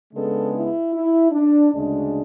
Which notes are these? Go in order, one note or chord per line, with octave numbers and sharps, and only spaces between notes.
C#3 G#3 B3 D4 A4
E4
E4
D4
D2 C#3 G#3 D4